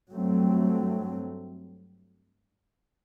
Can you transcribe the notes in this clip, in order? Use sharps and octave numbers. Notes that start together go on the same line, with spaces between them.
G2 F#3 A3 C4